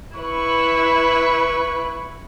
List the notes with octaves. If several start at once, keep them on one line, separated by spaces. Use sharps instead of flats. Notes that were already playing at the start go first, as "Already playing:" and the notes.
E4 B4 C#6